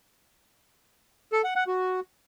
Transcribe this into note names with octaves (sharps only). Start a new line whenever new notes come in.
A4
F#5
F#5
F#4